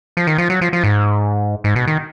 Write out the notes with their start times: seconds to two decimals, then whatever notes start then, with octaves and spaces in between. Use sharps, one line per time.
0.17 F3
0.27 D#3
0.38 F3
0.50 F#3
0.61 F3
0.73 F3
0.84 G#2
1.64 G#2
1.76 B2
1.87 D#3